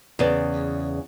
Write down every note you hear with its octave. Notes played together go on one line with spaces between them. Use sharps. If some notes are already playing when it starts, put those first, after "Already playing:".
E2 C#3 D5